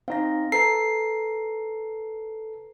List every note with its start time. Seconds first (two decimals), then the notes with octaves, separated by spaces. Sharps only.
0.08 C4 D#4 F5 A#6
0.52 A4 B4 A#5 C7